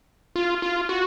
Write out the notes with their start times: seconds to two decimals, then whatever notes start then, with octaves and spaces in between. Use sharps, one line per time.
0.36 F4
0.62 F4
0.89 F#4